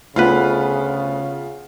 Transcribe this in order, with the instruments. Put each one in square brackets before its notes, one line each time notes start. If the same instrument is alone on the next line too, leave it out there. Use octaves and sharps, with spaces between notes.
[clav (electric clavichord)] D2 B4 [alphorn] C#3 [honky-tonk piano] B3 F4